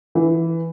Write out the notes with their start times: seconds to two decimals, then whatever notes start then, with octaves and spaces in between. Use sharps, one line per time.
0.15 E3